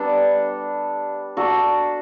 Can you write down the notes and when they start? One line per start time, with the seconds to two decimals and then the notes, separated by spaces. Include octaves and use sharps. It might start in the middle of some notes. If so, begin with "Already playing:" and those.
Already playing: G3 B3 D4 A4
1.37 D4 F#4 A4